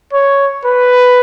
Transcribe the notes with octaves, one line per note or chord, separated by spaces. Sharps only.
C#5
B4